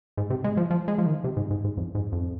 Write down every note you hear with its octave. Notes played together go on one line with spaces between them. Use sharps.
G#2
C3
G#3
F3
F3
G#3
F3
D#3
C3
G#2
G#2
G#2
F2
G#2
F2